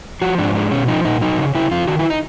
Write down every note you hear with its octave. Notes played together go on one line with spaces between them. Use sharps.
F3 F#4
G#2 D4
G#3 D4
B2 C#4
F3 D#4
A#2 D#4
F#3 D#4
C#3
C#3 E4
F2 F4
D#3 F#4
E4
D#4